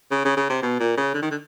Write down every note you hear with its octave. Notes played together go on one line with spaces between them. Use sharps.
C#3
C#3
C#3
C3
B2
A#2
C#3
D3
D#3
D3